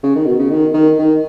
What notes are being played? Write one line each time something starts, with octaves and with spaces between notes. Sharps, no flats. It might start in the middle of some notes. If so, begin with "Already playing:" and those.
C#3
D#3
B2
C#3
D#3
D#3
D#3